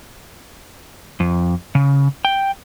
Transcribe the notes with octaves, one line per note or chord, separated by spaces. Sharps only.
F2
C#3
G5